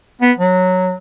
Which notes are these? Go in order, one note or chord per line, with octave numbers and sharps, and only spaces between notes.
B3
F#3